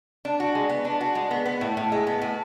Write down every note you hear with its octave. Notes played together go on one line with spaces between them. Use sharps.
D4
F#4
G#3
B3
D4
F#4
G#3
B3
B3
A2
A2
G#3
B3
A2